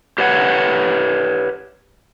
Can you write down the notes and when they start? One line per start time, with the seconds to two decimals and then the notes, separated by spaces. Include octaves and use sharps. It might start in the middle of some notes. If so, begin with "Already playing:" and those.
0.18 G4 B4 C#5 F#5